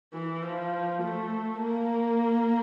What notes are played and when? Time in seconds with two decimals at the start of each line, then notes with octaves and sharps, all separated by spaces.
0.14 E3
0.42 F3
1.02 A3
1.61 A#3